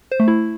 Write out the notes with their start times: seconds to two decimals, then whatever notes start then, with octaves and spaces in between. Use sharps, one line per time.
0.12 C5
0.20 A3
0.28 E4